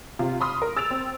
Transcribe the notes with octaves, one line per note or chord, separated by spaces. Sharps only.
C3 F4
B5 C6 D#6 F6
A#4
E6 A6 D7 F7
C4